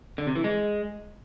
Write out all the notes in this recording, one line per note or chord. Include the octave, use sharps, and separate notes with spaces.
D3
C3
E3
G#3